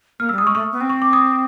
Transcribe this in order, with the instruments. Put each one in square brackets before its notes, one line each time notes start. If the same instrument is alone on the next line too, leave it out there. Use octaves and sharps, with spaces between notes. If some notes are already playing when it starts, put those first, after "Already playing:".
[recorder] A#3 [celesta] F6
[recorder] G3 [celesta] E6
[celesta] D#6
[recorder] G#3 [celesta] C#6
[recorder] A3 [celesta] C#6
[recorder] B3
C4
[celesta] C#6
D6
D#6